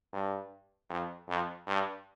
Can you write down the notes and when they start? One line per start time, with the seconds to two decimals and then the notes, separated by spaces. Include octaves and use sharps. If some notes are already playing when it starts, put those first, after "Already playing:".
0.13 G2
0.90 F2
1.28 F2
1.67 G2